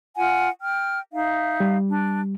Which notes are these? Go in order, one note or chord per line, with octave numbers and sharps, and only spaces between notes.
F4 F#5 G#5
G5 F6
D#4 E5 F5
G3
D4